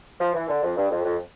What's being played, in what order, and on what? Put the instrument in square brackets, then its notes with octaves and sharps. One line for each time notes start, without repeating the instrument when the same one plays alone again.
[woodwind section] F3
E3
D3
F2
G2
F2
F2